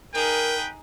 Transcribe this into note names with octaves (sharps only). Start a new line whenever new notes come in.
D#4 G#4 A#4 B4 G5